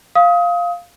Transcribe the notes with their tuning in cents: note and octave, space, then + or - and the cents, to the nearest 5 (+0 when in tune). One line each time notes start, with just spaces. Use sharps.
F5 +0 D#6 +30